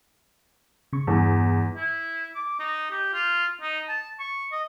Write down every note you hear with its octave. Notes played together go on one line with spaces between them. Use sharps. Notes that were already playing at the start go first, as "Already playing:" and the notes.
C#3 C#6
E2 G2
E4
D6
D#4
G4
F4
D#4
A5
C#6
D#5